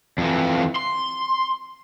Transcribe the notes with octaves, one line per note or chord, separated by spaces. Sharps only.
F2 E3
C6